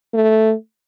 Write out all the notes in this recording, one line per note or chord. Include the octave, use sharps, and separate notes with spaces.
A3